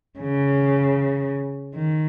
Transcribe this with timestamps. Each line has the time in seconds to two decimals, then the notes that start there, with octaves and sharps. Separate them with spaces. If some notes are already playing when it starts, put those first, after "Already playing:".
0.19 C#3
1.76 D#3